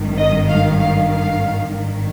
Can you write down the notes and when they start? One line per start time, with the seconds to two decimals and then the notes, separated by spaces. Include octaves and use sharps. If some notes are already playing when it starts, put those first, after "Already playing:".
Already playing: G#1 G2 D#3
0.19 D#5
0.49 F5
0.79 F5
1.11 F5
1.72 G#1 G2 D#3